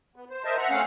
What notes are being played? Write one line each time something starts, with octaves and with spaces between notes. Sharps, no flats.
B3
C5
A#4 C5 D#5 E5 A5
E5 F#5 A#5
A3 C4 C#4 F5 F#5